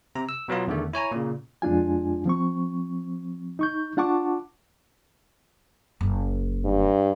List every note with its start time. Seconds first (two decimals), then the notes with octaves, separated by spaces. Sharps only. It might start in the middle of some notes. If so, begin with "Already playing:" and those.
0.15 C3 A#5
0.29 E6
0.48 B2 F#3 B3 F4
0.68 E2 D3 D#3 A3
0.93 E4 C#5 G#5 A#5
1.12 A#2 C#3
1.62 F2 G#3 D4 F4 G#5
2.25 F3 C4 C#6
3.59 D#4 C#6 G6
3.97 D4 F4 F#5 A5 C#6 D6
6.01 F#1
6.65 G2